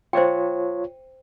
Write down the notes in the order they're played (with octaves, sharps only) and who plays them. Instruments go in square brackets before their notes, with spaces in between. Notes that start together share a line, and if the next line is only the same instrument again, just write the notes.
[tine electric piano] F4 C#5 [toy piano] C5 G5